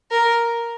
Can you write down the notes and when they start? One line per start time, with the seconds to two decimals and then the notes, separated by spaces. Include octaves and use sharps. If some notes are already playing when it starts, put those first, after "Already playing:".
0.11 A#4